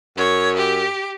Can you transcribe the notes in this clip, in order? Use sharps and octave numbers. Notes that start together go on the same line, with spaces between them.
F#2 C#5
G4